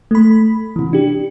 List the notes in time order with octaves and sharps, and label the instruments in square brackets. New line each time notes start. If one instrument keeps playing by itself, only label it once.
[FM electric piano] A3 B5
C3 E3
D4 G4